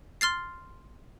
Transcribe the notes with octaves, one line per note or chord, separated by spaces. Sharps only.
C6 F6 A6 C7